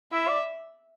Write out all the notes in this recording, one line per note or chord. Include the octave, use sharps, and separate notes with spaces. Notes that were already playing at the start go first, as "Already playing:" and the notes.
E4 E5
D5